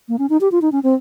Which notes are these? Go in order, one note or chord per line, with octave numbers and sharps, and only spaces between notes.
A#3
C#4
D#4
G4
F4
D#4
C#4
C4